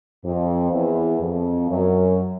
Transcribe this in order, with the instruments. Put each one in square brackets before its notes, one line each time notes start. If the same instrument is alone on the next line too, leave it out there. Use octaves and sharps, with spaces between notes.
[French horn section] F2
E2
F2
F#2